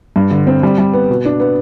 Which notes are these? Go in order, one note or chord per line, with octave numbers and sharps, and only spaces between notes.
G2
D3
C4
G3
G3
B3
B2
D4
B3